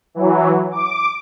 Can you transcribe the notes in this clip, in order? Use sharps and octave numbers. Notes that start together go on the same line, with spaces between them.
E3 F#3
D6